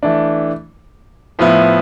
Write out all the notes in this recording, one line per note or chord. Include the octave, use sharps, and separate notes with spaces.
E3 A3 D4
A2 F3 B3 E4